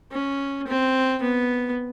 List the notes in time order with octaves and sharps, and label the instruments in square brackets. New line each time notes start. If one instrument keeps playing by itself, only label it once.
[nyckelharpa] C#4
C4
B3